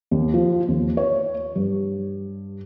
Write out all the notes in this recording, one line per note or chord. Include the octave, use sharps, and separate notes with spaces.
D#2
F3
D#2
C#5
G2